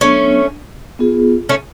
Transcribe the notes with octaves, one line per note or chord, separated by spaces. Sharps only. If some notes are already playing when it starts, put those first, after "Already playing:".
F#3 A3 B3 C#4 D4
B3 F4 G#4
A3 C#4